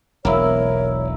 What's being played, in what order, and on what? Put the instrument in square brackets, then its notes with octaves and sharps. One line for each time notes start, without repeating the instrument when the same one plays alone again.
[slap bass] E1 B1 [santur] A#3 E4 E6 [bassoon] A#4 [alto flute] C#5